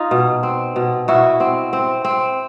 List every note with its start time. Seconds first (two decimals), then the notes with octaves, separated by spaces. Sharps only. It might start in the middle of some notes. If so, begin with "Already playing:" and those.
Already playing: D#4 F4
0.11 B2
0.43 C4
0.76 B2
1.08 B2 E4 F#4
1.40 C4
1.73 C4
2.05 C4